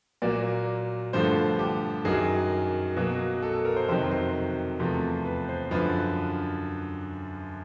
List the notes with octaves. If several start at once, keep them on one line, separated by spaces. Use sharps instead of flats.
A#2 F#3 A#3 D5
G2 D3 F3 A3 C5
G4
F#2 D#3 F#3 G#4
B2 F#3 A#3
A4
A4
A#4
C5
F2 C3 D#3 F#3 C5
C5
E2 C3 F3 A3
B4
C5
F#2 D3 F3 B4